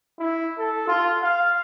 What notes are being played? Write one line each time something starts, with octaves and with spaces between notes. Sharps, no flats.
E4
A4
F4
F5